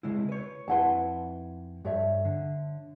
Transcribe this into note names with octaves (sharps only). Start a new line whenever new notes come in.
C#3 G#3 E4
B4 C#5
F2 E4 B4 F#5 A5 C6
G2 A4 C#5 E5
D3